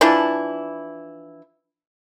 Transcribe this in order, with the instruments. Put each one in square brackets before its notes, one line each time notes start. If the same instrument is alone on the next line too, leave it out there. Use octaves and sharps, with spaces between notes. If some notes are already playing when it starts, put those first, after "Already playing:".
[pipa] E3 F3 D4 E4